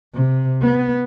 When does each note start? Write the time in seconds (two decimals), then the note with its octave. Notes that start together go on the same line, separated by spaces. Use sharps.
0.14 C3
0.62 B3